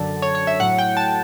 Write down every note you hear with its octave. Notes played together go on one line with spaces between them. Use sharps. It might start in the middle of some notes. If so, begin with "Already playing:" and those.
Already playing: F#2 D3 F#3 A5
C#5
C#5
E5
A2 F#3 F#5
G5
A5